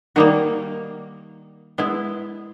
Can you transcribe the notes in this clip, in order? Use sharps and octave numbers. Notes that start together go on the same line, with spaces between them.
D#3 G3 A#3 D#4 F#4
G#3 B3 E4